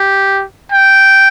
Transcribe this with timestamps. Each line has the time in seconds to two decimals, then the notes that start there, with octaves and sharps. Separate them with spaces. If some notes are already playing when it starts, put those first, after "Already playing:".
Already playing: G4
0.72 G5